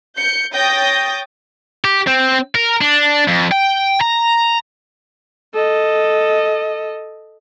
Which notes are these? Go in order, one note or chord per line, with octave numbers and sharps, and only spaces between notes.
G6 C#7
C#5 G5 D#6 G6 A6 A#6
G4
C4
A#4
D4
F2
G5
A#5
A4 D#5